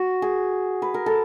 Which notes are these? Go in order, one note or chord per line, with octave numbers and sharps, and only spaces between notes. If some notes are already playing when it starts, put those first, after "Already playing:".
Already playing: F#4
G#4
B4
A#4
A4